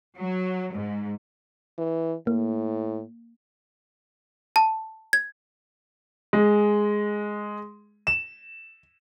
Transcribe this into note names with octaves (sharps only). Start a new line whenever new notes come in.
F#3
G#2
E3
A2 A#3
A5
G#6
G#3
E7